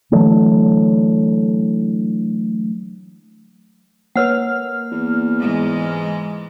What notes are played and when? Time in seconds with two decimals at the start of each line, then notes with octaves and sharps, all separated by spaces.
0.11 D3 E3 F#3 A3
4.16 A#3 B4 C#5 F#5 F6
4.91 E2
5.38 G#2 E3 G#3